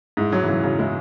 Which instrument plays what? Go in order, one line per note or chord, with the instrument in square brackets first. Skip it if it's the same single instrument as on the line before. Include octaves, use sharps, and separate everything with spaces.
[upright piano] G#2 [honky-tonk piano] E4
[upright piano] F#3 [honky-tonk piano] G#3
[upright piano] E3
[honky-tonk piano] C#3 [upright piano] F#3
[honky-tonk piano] C#3 [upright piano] F#3
[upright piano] G#3 [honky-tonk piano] E4